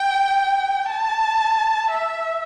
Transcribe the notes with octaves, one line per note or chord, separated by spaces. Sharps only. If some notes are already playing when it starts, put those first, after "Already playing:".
Already playing: G5
A5
E5